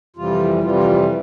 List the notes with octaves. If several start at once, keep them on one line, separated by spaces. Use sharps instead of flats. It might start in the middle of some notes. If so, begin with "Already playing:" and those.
F2 C3 E3 G3 F4
F2 C3 E3 G3 F4
F4